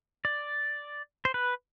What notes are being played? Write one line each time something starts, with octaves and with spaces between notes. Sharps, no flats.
D5
C5
B4